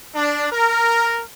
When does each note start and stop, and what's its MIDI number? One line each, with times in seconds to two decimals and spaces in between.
0.14 0.46 62
0.51 1.20 70